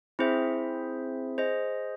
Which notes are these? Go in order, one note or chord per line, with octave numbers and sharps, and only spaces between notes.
C4 E4 G#4 C5 E5
G#4 C5 D#5